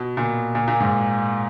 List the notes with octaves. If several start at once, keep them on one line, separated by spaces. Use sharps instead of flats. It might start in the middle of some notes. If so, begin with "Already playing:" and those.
Already playing: B2
A#2
A#2
A#2
G#2